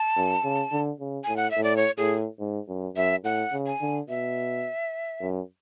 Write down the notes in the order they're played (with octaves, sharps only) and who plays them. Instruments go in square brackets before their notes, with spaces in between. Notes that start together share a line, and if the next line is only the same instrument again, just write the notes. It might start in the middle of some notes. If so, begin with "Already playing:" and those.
Already playing: [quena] A5
[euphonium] F#2
C#3
D3
C#3
[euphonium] A2 [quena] G#5
[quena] F#5
E5
[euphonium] A2
[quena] D5
C#5
[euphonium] A2 [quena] G#4
[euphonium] G#2
F#2
[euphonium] F#2 [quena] E5
[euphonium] A2 [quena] F#5
[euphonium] C#3
[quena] G#5
[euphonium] D3
[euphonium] B2 [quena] E5
[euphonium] F#2